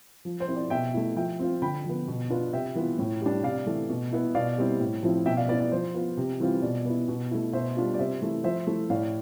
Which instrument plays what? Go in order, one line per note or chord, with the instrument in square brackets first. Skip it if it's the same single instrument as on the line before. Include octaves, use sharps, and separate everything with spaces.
[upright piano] F3
C5
C4 E4
D5
B2 E5 G5
A3 E4
F3 E5 G5
C4 F4
D3 G5 B5
F3 B3
B2
B3 D4 F4
C3 E5 G5
E3 B3 F4
A2
G3 D4
C3 D5 F5
E3 A3
B2
B3 E4
B2 D5 F5
G3 C4 E4
A2
F3 C4 E4
B2 E5 G5
D5 F5
B3 E4 D5
D5
F3 C5
B3 F4
C3
E3 G3 C4 F4
B2 D5
B3 E4
B2
A3 E4
B2 C5 E5
G3 D4 F4
D5
C3 C5 E5
E3 A3 E4
F3 C5 E5
A3 E4
A2 D5 F5